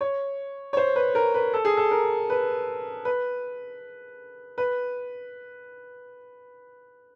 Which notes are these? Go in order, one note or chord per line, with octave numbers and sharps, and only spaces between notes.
C#5
C#5
C5
B4
A#4
B4
A4
G#4
A4
A#4
B4
B4
B4